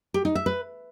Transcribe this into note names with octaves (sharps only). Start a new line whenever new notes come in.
G4
D#4
E5
B4